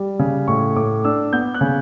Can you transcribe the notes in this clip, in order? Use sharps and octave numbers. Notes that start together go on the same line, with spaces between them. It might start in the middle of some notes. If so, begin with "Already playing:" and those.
Already playing: G3
C#3
A2 C#6
A2 D6
D4 E6
B3 G6
F#6
C#3